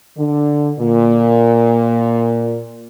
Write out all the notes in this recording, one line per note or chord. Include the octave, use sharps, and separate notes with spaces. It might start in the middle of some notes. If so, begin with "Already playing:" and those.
D3
A#2